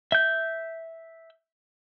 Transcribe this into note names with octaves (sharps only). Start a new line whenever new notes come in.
E5 G6